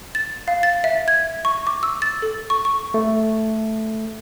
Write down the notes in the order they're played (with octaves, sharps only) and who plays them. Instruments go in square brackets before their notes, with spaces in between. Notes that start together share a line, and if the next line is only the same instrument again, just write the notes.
[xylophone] A6
F5
A6
E5
G#6
C#6
D6
E6
A6
A4
C#6
C#6
[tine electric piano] A3